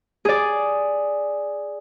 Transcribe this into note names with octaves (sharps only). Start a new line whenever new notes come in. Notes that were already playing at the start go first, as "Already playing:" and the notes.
G#4 D5